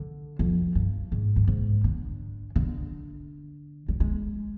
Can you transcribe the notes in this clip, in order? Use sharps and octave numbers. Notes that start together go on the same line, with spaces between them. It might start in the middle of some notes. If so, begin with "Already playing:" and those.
Already playing: D3
F2
G2
G#2
G2
G#2
D3
D3
G3
G#3